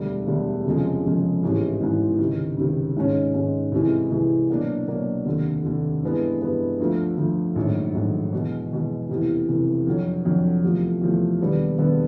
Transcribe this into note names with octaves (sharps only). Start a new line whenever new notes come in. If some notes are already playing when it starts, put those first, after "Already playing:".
Already playing: E1 D2 D3 G3
E1 D2 D3 G3
F1 F2 C#3 F3 G#3
F1 F2 C#3 F3 G#3
A1 G#2 E3 G#3
A1 G#2 E3 G#3
C#2 C3 D#3
C#2 C3 D#3
G#2 D#3 G#3 C#4
G#2 D#3 G#3 C#4
C2 C3 E3 G#3
C2 C3 E3 G#3
B2 F#3 A#3 D4
B2 F#3 A#3 D4
F1 D#2 D3
F1 D#2 D3
G2 E3 G#3 B3
G2 E3 G#3 B3
D2 D3 F3 A3
D2 D3 F3 A3
A#1 G#2 D#3 F#3 A3
A#1 G#2 D#3 F#3 A3
E2 B2 G#3
E2 B2 G#3
F1 E2 C3 E3
F1 E2 C3 E3
F2 D3 F#3
F2 D3 F#3
E2 C3 F3 A3
E2 C3 F3 A3
E1 D#2 D3 G3 B3
E1 D#2 D3 G3 B3